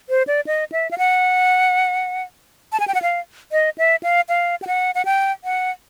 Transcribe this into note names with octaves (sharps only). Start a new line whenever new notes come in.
C5
D5
D#5
E5
F5
F#5
A5
G#5
G5
F#5
F5
D#5
E5
F5
F5
G5
F#5
F#5
G5
F#5